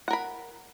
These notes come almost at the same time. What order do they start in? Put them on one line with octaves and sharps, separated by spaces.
F#5 A#4 B5